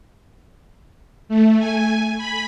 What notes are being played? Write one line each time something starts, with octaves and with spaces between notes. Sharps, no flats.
A3
G#5
B5